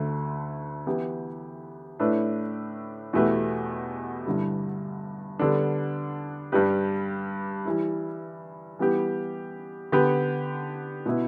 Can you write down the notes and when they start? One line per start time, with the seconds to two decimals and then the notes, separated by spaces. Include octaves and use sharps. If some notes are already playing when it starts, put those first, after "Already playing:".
Already playing: D2 D3 A3
0.87 E3 B3 E4 G4
2.00 A2 A3 D4 B4
3.13 E2 B2 A3 G4 B4
4.26 G2 D3 G3 E4
5.39 D3 G3 B3 D4 A4
6.52 G2 G3 D4 G4 B4
7.65 E3 G3 E4
8.79 E3 G3 B3 G4
9.92 D3 B3 G4 B4
11.06 B2 B3 E4 B4